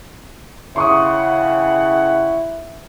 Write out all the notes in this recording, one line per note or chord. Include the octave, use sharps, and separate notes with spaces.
C#3 E4 G4 F#5 C6 C#6 D#6